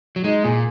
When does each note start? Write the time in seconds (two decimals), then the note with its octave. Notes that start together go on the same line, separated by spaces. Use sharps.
0.16 F#3
0.24 G#3 D#4
0.44 A#2 G#4